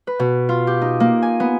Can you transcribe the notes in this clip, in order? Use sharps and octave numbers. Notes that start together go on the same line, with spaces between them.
B4
B2
F4
G4
D#4
A#3
G#5
B3